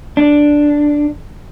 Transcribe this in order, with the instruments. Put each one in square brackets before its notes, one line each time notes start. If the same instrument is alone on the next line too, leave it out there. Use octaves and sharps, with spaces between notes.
[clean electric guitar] D4